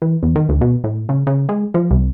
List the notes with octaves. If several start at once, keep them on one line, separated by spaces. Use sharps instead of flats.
E3
E2
D#3
D2
B2
A2
C#3
C#3
G#3
F3
C2